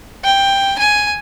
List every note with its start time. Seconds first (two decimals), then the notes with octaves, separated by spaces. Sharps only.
0.25 G5
0.79 G#5